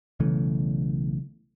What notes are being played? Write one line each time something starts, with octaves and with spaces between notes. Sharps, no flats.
B1 C#3 E3 A3